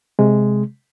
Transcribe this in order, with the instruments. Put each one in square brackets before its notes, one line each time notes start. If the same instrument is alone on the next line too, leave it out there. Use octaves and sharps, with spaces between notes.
[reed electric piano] C3 G#3